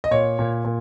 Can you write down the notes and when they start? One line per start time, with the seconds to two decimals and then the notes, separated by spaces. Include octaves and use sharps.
0.04 D#5
0.11 A#2 C#5
0.39 A#2
0.65 A#2